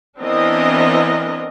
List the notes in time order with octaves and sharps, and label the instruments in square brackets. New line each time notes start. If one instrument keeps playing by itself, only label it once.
[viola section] E3 B3 C4 D4 A#4 D#5